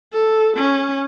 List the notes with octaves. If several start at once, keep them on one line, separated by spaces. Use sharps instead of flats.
A4
C#4